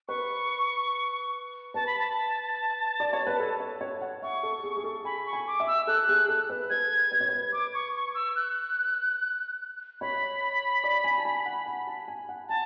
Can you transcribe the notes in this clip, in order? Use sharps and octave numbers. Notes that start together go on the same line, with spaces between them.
B4 C#6
B4 A5
B5
A5
D5
C#5
B4
A4
C#5
C#5
F#5
E5 C#6
A4
G#4
G#4
A4
G#5 B5
C#6
G#5
D6
E5
E6
A4 F#6
G#4
A4
B4
B4 G#6
B4
C#5
B4
D6
C#6
C#6
E6
F#6
C#5 B5
D5
G#5
A5
G#5
F#5
G#5
A5
G#5
F#5
G#5 A5